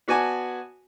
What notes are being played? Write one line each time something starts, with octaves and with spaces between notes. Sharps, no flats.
B3 F#4 D5 G#5 A5